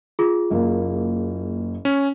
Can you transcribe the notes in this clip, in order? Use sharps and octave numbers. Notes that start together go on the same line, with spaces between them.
F4 G#4
F#1 A#3
C#4